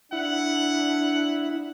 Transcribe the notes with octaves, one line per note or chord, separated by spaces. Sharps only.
D4 E4 F#5